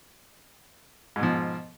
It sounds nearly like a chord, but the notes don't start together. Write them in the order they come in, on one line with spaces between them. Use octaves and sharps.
G#2 B2 F3